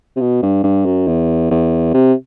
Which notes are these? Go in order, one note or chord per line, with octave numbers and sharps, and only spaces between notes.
C3
B2
G2
G2
F#2
E2
E2
C3